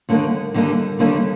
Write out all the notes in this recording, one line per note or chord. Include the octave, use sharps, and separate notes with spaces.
D#2 D3 G3 A#3 D#4
D#2 D3 G3 A#3 D#4
D#2 D3 G3 A#3 D#4